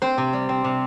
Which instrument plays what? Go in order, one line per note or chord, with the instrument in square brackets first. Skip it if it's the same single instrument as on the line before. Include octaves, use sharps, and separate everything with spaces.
[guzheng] C4 C5
C3
G3
C4
C3